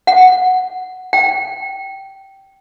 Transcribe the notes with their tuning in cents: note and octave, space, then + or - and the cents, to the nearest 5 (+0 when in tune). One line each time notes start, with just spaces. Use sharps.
F#5 -5
G5 -15